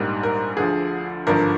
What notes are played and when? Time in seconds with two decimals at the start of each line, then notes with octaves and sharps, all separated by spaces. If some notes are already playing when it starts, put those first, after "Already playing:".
Already playing: A#1 G#2 G3 A#3 D#4
0.23 A#4
0.57 D2 D3 F3 G#4
1.27 G#1 G2 D3 F3 A#4